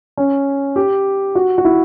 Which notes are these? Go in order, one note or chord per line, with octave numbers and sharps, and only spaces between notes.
C#4
G4
F#4
F#4
E4